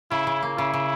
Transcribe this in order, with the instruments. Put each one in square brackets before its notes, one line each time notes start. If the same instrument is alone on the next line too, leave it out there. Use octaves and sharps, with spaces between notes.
[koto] C#3 [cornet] E4
[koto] C#3
A#3
[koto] C#3 [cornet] E4
[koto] C#3